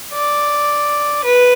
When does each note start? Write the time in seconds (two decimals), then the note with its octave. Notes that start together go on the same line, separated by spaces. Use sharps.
0.14 D5
1.24 B4